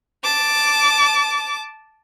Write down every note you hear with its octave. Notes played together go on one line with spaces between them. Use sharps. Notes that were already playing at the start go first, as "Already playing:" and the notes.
A5 D6